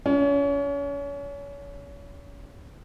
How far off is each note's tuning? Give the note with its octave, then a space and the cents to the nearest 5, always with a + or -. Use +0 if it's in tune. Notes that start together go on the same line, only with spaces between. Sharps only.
C#4 +35 F4 -15